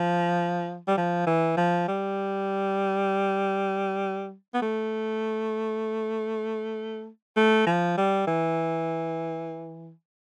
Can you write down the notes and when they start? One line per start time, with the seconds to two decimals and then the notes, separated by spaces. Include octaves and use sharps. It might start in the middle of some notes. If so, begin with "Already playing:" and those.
Already playing: F3
0.88 G3
0.97 F3
1.27 E3
1.57 F3
1.88 G3
4.54 B3
4.62 A3
7.37 A3
7.66 F3
7.98 G3
8.27 E3